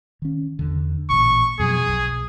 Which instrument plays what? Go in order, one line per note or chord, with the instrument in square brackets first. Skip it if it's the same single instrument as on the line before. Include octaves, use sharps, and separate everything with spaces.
[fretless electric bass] D#3 C#4
E2 D3
[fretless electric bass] A1 A#2 [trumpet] C#6
[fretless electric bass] F2 B2 F#3 [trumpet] G#4
[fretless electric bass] B1